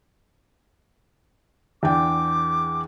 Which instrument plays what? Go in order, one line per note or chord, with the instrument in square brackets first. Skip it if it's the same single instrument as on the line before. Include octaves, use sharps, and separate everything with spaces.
[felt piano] E2 D4 G5 [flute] D6